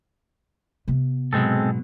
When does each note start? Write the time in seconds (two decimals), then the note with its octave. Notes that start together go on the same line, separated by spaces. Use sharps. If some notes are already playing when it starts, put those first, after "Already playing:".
0.88 C3 B3
1.33 G#2 B2 F#3 G#3 C4 A4